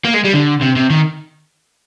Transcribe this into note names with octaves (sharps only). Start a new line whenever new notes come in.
A#3
G#3
G3
D3
C3
C3
D#3